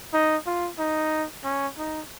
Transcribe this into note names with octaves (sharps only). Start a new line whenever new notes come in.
D#4
F4
D#4
C#4
D#4